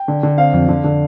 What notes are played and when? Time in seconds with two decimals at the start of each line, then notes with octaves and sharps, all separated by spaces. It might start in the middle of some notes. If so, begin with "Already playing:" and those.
Already playing: G5
0.08 D3
0.23 D3
0.38 C4 F5
0.53 F2
0.69 D3
0.84 D3